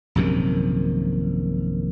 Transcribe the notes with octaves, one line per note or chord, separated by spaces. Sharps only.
A#1 F#2 C3 D#3